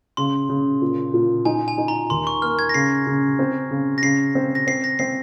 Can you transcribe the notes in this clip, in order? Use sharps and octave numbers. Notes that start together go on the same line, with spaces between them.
C#3 C6
C#3
A#2
A#2
D#4 G#5
G#5
D#4
A#5
D#2 C6
C#6
A#3 F6
G#6
A#6
C#3 C7
C#3
C4
C#3
A#6
C#3 C7
C4
A#6
C4 C7
A#6
C4 C7